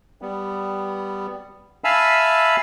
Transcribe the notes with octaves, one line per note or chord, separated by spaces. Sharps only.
G3 B3
E5 F5 G#5 A5 B5 E6